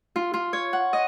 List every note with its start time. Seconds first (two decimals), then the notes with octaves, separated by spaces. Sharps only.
0.16 F4
0.34 F4
0.53 C#5
0.73 F#5
0.93 D#5